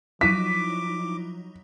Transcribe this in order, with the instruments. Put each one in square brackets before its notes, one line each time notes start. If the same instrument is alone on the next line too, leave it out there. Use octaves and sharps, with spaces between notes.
[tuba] F3 [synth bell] F#3 D#4 E4 [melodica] D6 [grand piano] B6